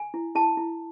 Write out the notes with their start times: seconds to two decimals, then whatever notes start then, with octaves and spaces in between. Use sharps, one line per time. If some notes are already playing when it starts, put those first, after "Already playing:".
Already playing: G#5
0.14 E4
0.35 E4 A5
0.57 E4